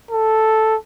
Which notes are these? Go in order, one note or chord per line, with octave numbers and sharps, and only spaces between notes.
A4